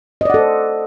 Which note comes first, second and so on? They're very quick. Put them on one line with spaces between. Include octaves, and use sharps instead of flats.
D#5 D5 F#5 A4 C5